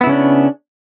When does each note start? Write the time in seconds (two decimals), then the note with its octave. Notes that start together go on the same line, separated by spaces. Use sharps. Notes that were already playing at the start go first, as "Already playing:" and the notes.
0.01 B3
0.04 E4
0.07 C#3
0.09 C#4
0.12 D4